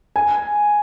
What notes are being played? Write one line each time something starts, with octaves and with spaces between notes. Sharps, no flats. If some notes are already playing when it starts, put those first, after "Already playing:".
G#5